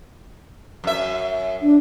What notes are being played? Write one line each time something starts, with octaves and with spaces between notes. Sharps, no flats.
F#2 E5
D4